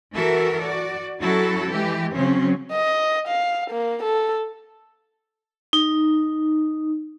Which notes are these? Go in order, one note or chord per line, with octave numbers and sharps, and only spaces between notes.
E3 F#4 A4 A#4 E5
F#4 D5
F#3 C#4 E4 F#4 A4
E3 G#3 G4
C#3 F#3 C4 C#4
D#5
F5
A#3
A4
D#4